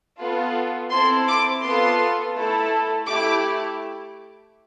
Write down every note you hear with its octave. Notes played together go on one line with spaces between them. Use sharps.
B3 F4 A4
C4 E4 A4 C6
D6
B3 F4 A4 C6
A3 E4 A4
A3 E4 G4 D6